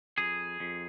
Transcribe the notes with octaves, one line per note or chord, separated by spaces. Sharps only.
F2 G#4
F2